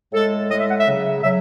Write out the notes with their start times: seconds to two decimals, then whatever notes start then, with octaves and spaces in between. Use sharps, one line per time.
0.12 A2 G#3 A4
0.50 A2 D#5
0.53 G#3
0.59 E5
0.69 F#5
0.77 E5
0.87 C#3 F#3
1.24 C#3 F#3 E5